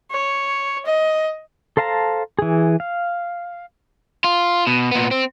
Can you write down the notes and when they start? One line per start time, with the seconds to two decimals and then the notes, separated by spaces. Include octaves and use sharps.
0.11 C#5
0.85 D#5
1.77 A4 C5 F5 A5 A#5
2.39 E3 G#4
2.80 F5
4.24 F4
4.67 B2
4.91 A#2 B3
5.11 C4